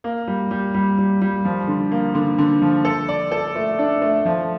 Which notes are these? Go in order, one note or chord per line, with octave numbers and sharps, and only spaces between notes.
A#3
G3
G3
G3
G3
G3
F3
D3
A#3
D3
D3
F3
A4
D5
A4
A3
D4
A3
F3